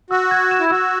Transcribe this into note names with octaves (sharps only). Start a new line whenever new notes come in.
F#4 E6
G#6
E7
E4
F#4 E6